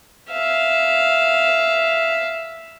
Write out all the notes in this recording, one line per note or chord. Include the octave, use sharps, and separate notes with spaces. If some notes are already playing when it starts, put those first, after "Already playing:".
E5 F5